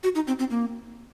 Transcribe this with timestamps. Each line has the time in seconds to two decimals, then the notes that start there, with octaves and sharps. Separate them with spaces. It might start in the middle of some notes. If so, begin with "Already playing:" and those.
0.04 F#4
0.15 D#4
0.27 C4
0.39 C4
0.51 A#3